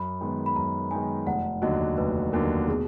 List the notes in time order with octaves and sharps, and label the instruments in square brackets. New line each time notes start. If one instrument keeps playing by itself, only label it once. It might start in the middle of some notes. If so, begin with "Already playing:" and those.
Already playing: [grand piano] F#2 [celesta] B5
[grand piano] D#3 G#3 B3 D#4
[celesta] B5
[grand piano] F#2 [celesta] A#5
[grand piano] D#3 G#3 B3 D#4 [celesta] G#5
[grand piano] F1 [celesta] F#5
[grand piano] D#2 D3 F#3 [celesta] D#5
[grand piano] F1 [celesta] B4
[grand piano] D#2 D3 F#3 [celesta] A#4
[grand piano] B2 [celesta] G#4